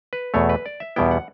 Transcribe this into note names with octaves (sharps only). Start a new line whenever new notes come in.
B4
E2 B2 A3 C#5
B4
D5
E5
E2 B2 G3 B3 E4 G5
F#5